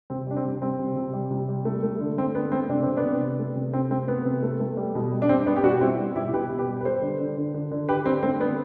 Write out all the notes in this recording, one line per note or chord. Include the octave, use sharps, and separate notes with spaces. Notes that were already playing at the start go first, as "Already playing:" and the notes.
C3 C4
G3 D4
C4
C3
G3 C4
C3
C3
G3
C3
G3
A3
A3
D3
A3 C4
D3 B3
A3 C4
C3 D4
C3 C4
B3 D4
C3
C3
A3
C3
C3 C4
A3 C4
A3 B3
C3
A3
A3
G3
B2
G3
D4
G3 C4
G3 B3 D4
G4
B2 D4 F#4
G3 C4 E4
G3
B2 E4 G4
B2 G4 B4
B2
G4 B4
G3
B4
G3 A4 C5
D3
D3
D3
D3
D3
D3 G4 B4
D3 C4
A3 C4
D3 B3